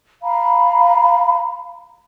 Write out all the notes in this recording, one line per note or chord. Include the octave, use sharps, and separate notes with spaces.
F5 A#5 B5